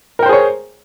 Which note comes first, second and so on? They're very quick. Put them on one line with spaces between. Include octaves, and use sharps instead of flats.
A#4 G5 C5 G#4 C#5